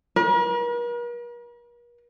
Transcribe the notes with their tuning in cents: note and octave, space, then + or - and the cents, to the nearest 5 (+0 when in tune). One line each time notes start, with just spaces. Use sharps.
A#4 +45